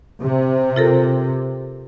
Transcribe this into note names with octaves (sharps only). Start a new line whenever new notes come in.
C3
F4 A4 A#4